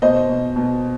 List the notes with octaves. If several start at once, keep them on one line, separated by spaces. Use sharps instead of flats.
B2 C5 D#5
B2
B2